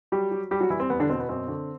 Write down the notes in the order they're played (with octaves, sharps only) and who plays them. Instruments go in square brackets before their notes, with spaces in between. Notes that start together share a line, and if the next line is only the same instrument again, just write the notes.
[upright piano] F#3 G3 G4
F#3
G3 G4
F#3 F#4
E3 G3 E4
C4
E2 B3
D3 D4
B2 C4
B3
F#2 C4
D3